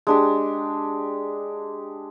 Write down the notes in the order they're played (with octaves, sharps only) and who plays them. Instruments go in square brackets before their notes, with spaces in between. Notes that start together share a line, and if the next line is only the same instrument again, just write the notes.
[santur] G#3 D4 G4